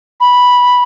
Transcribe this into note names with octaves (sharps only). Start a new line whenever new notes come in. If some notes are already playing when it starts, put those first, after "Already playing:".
B5